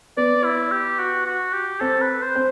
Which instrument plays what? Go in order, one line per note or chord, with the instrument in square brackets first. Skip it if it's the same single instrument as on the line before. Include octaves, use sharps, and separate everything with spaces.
[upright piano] B3 [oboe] D5
[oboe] E4
G4
F#4
F#4
G4
[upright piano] C4 [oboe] A4
[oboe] B4
C5
[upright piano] C4